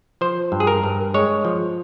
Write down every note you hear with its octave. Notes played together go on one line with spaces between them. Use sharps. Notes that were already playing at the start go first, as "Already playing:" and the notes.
F3 C5
G2
G#4
A#4
G2
G#3 C#5
F3